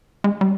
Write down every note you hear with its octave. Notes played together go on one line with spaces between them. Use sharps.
G#3
G3